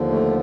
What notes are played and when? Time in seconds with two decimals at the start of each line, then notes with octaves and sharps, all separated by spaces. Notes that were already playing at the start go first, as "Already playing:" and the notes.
Already playing: D#2 D3 F3
0.09 A3